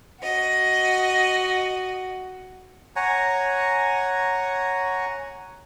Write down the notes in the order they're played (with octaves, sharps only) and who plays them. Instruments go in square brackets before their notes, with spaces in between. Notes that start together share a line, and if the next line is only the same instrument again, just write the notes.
[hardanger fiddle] F#4 [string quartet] D#5
[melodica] C#5 F#5 G#5 A#5